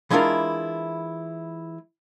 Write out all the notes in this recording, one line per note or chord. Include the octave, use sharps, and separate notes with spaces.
E3 G#3 D4 E4 F4 A#4